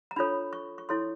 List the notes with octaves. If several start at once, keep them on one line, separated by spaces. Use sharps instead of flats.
A#5
D4 F4 A4 C#5 B5
C#6
C#6
E4 A4 C#5 C6